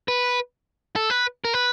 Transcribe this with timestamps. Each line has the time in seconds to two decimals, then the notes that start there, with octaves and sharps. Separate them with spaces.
0.08 B4
0.96 A4
1.10 B4
1.45 A#4
1.54 B4